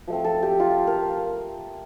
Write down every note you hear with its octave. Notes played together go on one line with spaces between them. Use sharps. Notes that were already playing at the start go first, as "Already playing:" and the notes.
F3 A3 C4
A4
G4
F4
A#4